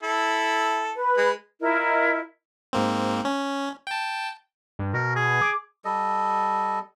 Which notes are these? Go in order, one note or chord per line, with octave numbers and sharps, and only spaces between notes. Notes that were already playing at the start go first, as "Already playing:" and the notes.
E4 A4
B4
G#3
E4 F4 A#4 D#5
G#2 A#3 C4
C#4
G5 A5
G2
B2 A#4
G#4
D6
G3 A4 D#5